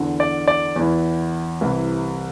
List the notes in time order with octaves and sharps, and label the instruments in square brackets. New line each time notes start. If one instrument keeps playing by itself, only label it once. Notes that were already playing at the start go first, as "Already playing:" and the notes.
Already playing: [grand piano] E2 D3
D5
D5
E2
E3
C2 C3 E3